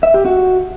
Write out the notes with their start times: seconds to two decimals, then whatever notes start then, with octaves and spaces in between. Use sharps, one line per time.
0.03 E5
0.14 G4
0.25 F#4